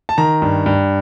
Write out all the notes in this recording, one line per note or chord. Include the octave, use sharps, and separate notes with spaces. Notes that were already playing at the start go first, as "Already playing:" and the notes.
A5
D#3 A#5
G2
G2